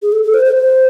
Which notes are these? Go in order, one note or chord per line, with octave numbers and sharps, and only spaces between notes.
G#4
A4
A4
C5
C5
C5